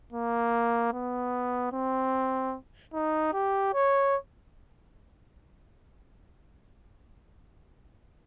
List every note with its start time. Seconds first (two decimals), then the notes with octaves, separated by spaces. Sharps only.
0.12 A#3
0.93 B3
1.72 C4
2.93 D#4
3.33 G4
3.74 C#5